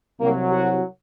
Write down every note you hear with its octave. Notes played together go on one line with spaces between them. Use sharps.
C2 C3 F#3 A#3
F#4